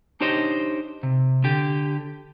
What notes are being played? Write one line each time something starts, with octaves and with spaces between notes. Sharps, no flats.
D4 D#4 G4 C5 C#5 D#5
C3
D3 G4